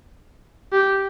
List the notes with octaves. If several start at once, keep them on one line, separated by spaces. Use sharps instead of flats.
G4